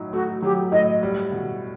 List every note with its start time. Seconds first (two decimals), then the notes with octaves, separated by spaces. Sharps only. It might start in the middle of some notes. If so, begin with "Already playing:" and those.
Already playing: A2 F#3 D#4
0.13 A3 F#4
0.42 F#3 G4
0.72 A2 D#5
1.03 G3
1.32 B2